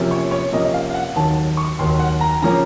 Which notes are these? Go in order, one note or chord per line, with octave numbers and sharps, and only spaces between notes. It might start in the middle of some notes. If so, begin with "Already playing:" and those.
Already playing: C3 F3 A#3 C#4
C#5
C#5
C3 F3 A#3 C#4 D#5
F5
F5
F#5
D#2 D#3 F#3 A5
C#6
D#2 D#3 F#3 C6
F#5
A#5
C#3 F3 A#3 C#4 A#5